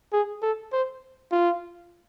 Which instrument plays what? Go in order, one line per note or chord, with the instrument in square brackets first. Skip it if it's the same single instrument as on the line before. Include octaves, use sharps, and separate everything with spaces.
[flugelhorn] G#4
A4
C5
F4